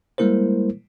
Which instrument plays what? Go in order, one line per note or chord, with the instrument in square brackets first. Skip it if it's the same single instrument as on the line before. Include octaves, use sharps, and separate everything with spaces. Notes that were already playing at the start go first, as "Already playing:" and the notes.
[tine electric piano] G3 G#3 A#3 E4 A#4 C5